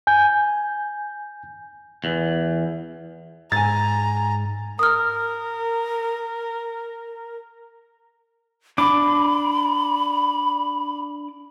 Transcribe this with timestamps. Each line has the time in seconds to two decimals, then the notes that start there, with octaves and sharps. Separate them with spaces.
0.07 G#5 G6
2.04 E2
3.52 G#2 G#5 A#5 A6
4.79 A#4 D#6 F6
8.78 D4 B5 D6